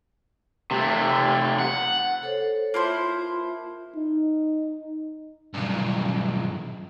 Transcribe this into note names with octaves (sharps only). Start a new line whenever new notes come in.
C3 A3
F#5
A4 C5 C#5
A#3 E4 F4 C5 A5
D#4
B1 G2